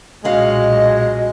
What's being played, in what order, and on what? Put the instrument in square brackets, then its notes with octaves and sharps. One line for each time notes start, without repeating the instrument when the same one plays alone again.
[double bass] B1 A#2 [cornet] G#3 [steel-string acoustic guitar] C#4 F#4 F5 [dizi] D#5